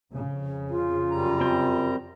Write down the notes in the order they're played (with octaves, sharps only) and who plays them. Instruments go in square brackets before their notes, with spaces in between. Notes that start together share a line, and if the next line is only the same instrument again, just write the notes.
[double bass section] F2 C#3
[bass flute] F4
[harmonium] F#2 G3 A#5
[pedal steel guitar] C4 G5